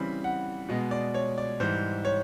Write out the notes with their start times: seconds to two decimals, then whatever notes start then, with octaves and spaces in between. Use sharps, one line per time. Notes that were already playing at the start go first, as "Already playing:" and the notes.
Already playing: C#3 E3 G3 C4 B5
0.24 F#5
0.69 B2 G#3 B3 D#5
0.91 D5
1.14 C#5
1.38 D5
1.60 G#2 E3 G3 C5
2.05 C#5